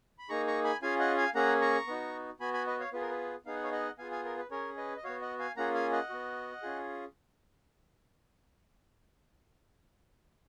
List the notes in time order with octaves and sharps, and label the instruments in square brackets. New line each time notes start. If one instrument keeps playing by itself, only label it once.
[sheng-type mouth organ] B5
A#3 D#4 G#4 A#5 C#6
A#5 C#6
G#5 B5
C#4 F4 G#4 F5 G#5
D#5 F#5
F5 G#5
A#3 C#4 G#4 F#5 A#5
A#5 C#6
B3 D#4 F#4
B3 F#4 G#5 B5
G#5 B5
B4 D#5
C#5 F5
B3 F4 G#4 B4
A#4
B4
B3 D#4 G#4 F5
F#5
C#5 F5
D#5 F#5
B3 F4 G#4 F5 G#5
F5 G#5
A#4
B4
C#4 G#4 A#4 C#5
B4 D#5
D#5
B3 F#4 C#5 F5
D#5 F#5
F5 G#5
A#3 C#4 F4 G#4 F#5 A#5
F5 G#5
D#5 F#5
B3 F#4
C#4 F4 G#4